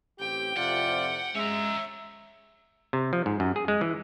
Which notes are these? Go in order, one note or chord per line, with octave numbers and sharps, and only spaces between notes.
A1 C4 G4 G5
F2 A2 C3 F4 D5 F#5
G#3 C#4 E5 A#5
C3
F3
G#2
F#2
G#4
G#3
E3